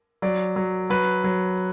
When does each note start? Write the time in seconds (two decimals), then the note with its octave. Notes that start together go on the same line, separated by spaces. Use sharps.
0.22 F#3 D5
0.56 F#3
0.90 F#3 B4
1.24 F#3